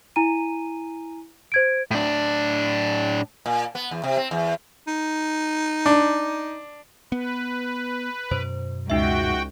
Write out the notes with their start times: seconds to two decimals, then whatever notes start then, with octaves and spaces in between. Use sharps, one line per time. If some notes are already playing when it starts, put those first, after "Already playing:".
0.16 E4 G#5 A#5 D#7
1.52 C5 G#6 D7
1.91 A2 D4
3.46 A#2
3.75 B3
3.91 E2
4.04 C3
4.17 C4
4.31 E2
4.88 D#4
5.86 D4
7.12 B3 B4
8.31 F#2 B2 C5
8.90 C#2 D#4 F#4 E5 G5